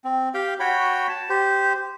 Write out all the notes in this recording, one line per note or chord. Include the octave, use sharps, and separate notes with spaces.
C4
G4 F5 G5
F#4 C#5 G5 B5
A5
G4 C5